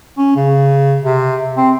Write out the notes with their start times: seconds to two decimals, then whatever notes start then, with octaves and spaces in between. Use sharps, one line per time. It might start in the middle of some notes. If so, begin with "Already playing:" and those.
0.18 C#4
0.36 C#3
1.04 C3
1.57 C4